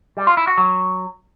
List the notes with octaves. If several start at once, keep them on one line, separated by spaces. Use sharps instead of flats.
G3
F4
E4
F#4
F#3